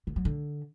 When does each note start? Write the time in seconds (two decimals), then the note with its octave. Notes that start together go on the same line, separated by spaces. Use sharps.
0.07 D3
0.16 F#3
0.25 D3